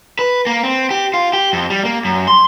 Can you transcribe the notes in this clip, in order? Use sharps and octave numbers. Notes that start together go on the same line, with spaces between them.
B4
A#3
C4
G4
F4
G4
F2
G3
A#3
F#2
C6